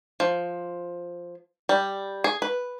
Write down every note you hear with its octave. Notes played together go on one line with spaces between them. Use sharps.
F3
G3
G#4
B4